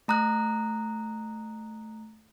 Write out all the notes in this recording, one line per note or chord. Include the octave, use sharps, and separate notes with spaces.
A3 A#5 D#6 F#6